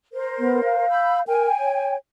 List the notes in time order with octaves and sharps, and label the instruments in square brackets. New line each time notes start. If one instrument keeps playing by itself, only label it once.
[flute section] A#4 C5
[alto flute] B3
F5
[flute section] B5 E6 G6
[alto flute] A#4 [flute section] G5 G#5
[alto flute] C#5